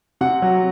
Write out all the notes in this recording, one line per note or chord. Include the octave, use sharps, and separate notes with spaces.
C3 F#5
F#3